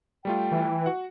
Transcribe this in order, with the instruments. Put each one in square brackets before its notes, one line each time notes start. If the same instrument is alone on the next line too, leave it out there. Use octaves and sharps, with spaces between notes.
[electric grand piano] G3 A3 F4 [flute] G5
[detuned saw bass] E3
[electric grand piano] F#4 F#5